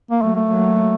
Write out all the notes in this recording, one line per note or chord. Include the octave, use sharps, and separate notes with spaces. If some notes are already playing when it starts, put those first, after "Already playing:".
A#3
F#3 A3 A#3
A3
F#3 A#3